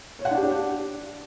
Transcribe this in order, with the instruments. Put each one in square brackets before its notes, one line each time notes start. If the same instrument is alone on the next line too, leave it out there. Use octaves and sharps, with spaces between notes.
[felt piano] C#5
F#5
D4
G4
D4